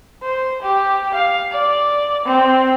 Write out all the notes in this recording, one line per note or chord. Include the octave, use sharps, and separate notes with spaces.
C5
G4
F5
D5
C4